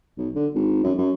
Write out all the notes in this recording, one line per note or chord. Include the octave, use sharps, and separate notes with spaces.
B1
D3
G#1
F#2
F#2